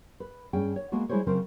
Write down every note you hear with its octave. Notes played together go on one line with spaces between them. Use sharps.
B4
G2 C#4 G#4 G5
C#5
G#3 A#3 B3 F#4
G3 G#3 E4 G#4 C5 C#5
C#3 F#3 C4 A#4 C5